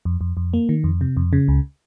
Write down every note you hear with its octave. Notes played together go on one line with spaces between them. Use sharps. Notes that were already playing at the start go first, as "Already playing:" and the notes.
F2
F2
F2
A#3
D#3
F2
C3
F2
C#3
C#2